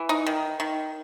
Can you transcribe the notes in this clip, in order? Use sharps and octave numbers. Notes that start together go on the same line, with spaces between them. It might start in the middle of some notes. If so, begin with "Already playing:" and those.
Already playing: E3
D#4
D#3
D#3